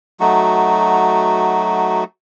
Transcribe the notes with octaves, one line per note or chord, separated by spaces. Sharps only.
F#3 A3 D#4 F#4